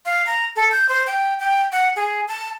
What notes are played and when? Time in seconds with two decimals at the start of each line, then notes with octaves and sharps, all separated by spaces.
0.06 F5
0.27 A#5
0.56 A4
0.72 G6
0.89 C5
1.07 G5
1.40 G5
1.72 F#5
1.96 G#4
2.28 A5